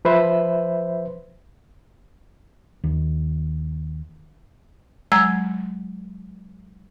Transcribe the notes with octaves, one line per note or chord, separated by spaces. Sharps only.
F3 B4 C5 E5
D#2
F#3 G#3 A#5 E6 G#6